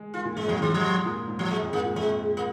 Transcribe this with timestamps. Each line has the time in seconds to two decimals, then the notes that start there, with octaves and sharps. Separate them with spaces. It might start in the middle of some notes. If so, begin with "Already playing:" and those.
Already playing: G#3
0.14 D#3 F4
0.25 A#2
0.36 G#2 G#3
0.48 F2 F3
0.59 G#2 D#3
0.74 F3
1.05 A#2
1.28 G#2
1.39 F3
1.50 G#2 G#3
1.62 F2
1.73 G#2 A#3
1.85 A#2
1.96 F2 G#3
2.37 A#3